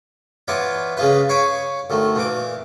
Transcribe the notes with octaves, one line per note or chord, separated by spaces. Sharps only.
E3 B3 F4 C#5 D5
C#3 G#3 F4 B4
C#5 F5 G#5 B5 C#6 D6
D2 D#3 A3
A#2 E3 D6